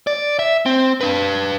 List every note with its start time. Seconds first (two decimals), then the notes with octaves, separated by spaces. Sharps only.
0.07 D5
0.39 E5
0.66 C4
1.01 D4 B4